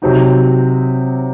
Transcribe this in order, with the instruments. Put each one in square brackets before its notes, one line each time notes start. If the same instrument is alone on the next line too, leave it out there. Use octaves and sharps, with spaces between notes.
[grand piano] C3 F#3 C4 D#4 F#4